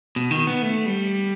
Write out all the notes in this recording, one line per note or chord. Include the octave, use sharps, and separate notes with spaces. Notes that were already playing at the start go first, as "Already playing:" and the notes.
B2
D#3
B3
A3
G3